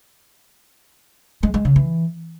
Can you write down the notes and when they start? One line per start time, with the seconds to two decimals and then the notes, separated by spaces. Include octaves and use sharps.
1.43 G#3
1.54 G#3
1.65 C#3
1.76 E3